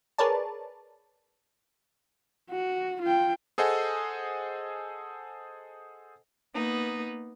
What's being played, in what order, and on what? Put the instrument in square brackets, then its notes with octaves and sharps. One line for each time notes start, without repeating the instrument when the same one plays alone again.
[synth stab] G#4 A#4 B4 C#5 D5 A5
[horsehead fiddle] F#4
F4 G5
[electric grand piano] G#4 A4 C5 D#5 F#5 G#5
[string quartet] A#3 B3 D#4